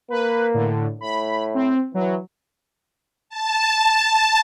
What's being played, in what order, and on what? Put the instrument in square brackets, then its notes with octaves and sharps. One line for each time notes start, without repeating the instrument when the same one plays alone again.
[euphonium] A#3 [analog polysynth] B4
[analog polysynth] A2 D3
[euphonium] A2 [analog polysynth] B5
[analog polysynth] C4
[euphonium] E3 [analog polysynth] F#3
[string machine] A5